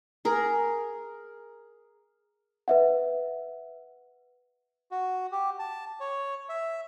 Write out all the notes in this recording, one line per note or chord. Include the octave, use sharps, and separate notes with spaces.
G#4 A#4
B4 E5 F#5
F#4
G4
A5
C#5
E5